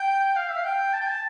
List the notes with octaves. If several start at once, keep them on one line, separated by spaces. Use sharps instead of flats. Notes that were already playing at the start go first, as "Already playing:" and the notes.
Already playing: G5
F5
E5
F5
G5
A5
G5
A5